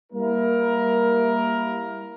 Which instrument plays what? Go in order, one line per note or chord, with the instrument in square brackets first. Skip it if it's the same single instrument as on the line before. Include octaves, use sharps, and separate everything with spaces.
[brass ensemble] G3 A#3 E4 A#4